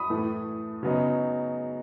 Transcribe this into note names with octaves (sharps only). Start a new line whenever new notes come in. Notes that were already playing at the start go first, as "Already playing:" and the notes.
Already playing: B5 D#6
A2 E3 A3
C#3 F#3 B3 D#4